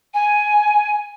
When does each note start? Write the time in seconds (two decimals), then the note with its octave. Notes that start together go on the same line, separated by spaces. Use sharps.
0.13 G#5